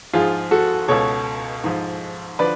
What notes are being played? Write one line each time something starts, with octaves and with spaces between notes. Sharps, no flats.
G#2 F3 F4 G#4
F#4 A4
C#2 B2 A4 C#5
G#2 F3
D3 F3 B4 D5